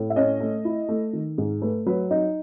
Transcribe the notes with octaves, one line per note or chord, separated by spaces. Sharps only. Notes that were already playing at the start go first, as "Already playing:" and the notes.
Already playing: A2
E5
C#4 D#5
A3
E4
A3
D#3
G#2
A3 B4
F#3 B4
D#4 D#5